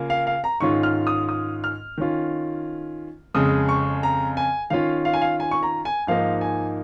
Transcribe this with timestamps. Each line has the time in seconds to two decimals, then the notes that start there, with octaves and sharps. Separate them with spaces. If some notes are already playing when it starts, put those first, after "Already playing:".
Already playing: C#3 A#3 F4
0.10 F5
0.27 F5
0.44 A#5
0.60 G#2 D#3 C#4 F4 C#6
0.83 F6
1.07 D#6
1.29 D#6
1.64 F6
1.98 D#3 C#4 F4
3.34 F2 C#3 G#3 D#6
3.69 C#6
4.03 A#5
4.37 G#5
4.70 D#3 C#4 F4 F5
5.05 F5
5.13 G#5
5.21 F5
5.40 G#5
5.51 C#6
5.63 A#5
5.85 G#5
6.07 G#2 F3 A#3 D#4 F5
6.41 G#5